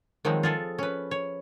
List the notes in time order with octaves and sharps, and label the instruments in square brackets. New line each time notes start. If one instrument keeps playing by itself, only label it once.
[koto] D#3 F3 F#3 G#3 C4
F4 G#4 A4
C#4 B4
C#5